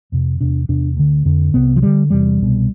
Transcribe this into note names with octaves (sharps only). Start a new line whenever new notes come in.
F2 C3
E2 C3 D4
E2 C3 D4
D2 D3
F2 D3
C2 C3 B3
F3
D2 D3 G3
E2 C3 G3
C2 B2